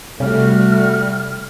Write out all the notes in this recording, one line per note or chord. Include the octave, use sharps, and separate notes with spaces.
C3 G3 A3 F#4 F6